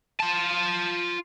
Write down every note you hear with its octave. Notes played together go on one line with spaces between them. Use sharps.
F4 A5